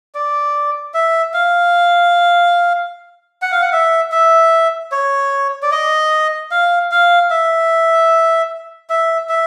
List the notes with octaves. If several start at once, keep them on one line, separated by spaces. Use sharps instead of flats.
D5
E5
F5
F#5
F5
F#5
E5
E5
C#5
D5
D#5
F5
F5
E5
E5
E5